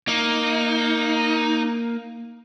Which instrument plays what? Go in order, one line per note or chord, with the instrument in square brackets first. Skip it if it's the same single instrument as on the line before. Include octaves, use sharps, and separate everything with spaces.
[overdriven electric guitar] A#3 [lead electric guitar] D#4